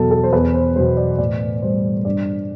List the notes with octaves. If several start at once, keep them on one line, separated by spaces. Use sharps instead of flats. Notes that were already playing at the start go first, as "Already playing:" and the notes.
Already playing: E2 B2 F#3 A4
A4
C5
E2 B4
C5
B2 F#3 C5
D5
A2 D5
G3 C5
G2 D5